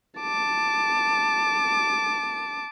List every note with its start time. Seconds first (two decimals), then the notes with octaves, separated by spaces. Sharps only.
0.20 A5 D6